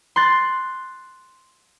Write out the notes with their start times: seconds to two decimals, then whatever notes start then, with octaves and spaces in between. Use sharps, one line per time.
0.16 C6 F#6 A6